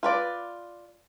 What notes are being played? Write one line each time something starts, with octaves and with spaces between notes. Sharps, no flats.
F4 B4 D5